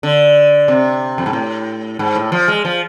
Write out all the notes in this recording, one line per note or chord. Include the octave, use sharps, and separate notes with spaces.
D3
C3
F2
G#2
A2
G#2
A2
F3
G#3
F3